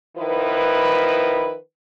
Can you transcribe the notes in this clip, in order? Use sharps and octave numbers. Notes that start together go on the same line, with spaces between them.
D#3 F3 E4 B4